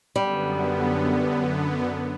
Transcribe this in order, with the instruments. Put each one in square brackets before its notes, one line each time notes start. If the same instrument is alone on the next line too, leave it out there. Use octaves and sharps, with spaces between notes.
[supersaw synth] F#2 D3 B3 [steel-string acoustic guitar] G3